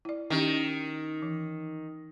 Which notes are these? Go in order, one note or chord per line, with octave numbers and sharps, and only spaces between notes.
E4 D5
D#3 C#4 G4
E3